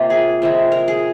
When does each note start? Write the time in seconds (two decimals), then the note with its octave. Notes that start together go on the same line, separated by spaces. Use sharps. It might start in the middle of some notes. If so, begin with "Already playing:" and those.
Already playing: C3 A#3 F4
0.10 G#4
0.42 C3 F3 G#3
0.72 A#4
0.88 G#4